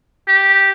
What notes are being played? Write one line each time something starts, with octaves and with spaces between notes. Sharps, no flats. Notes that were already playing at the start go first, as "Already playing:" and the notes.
G4